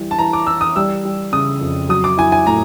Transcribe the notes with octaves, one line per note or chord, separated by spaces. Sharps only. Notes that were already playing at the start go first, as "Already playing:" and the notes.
Already playing: E3 G3
A5
E3 A#5
D6
E3 E6
D#6
G3 E6
G3
C#3 D#6
F2
F#3 D#6
D6
E4 G#5
G#5
A2 A#5